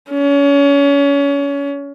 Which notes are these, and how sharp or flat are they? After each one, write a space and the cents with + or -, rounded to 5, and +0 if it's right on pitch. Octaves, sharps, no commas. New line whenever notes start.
C#4 +30